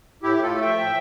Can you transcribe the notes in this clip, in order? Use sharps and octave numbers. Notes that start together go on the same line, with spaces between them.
A2 E4 G4
A2 F4 A4
A3
E5 G5
F3
A2